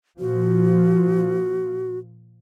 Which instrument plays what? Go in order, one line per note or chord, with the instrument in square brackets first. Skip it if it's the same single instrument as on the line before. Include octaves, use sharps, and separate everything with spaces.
[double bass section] A#2 F3 [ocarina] F#4